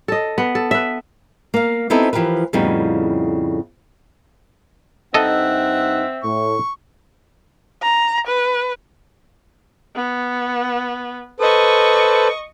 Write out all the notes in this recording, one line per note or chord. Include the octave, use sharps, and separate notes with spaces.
A4 D#5
B3
A4
B4 E5
A#3 F5
B3 C4 D#4 E4 F#4 A4
E3 F3 G4 A#4 B4
F2 A2 C#3 G3 B3 D#4
G2 C4 D#4 A4 D#5 E5 F#5
A2 C#6
A#5
B4
B3
A4 B4 C5 D#5 C#6